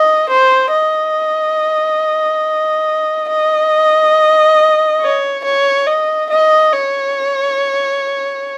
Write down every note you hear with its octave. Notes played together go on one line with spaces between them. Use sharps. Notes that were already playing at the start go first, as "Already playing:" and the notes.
Already playing: D#5
C5
D#5
D#5
C#5
C#5
D#5
D#5
C#5